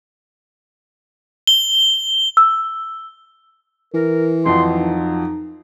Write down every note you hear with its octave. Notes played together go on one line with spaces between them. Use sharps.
G7
E6
E3 A#4
F2 F3 F#3 C6
D#4